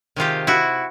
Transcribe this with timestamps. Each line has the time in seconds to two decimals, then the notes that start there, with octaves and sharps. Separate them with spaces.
0.16 C3 D#3 G#3 F4 G4
0.47 E4 F#4